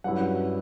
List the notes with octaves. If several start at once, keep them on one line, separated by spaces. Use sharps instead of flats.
G2 F#3 C#4 E4 F#5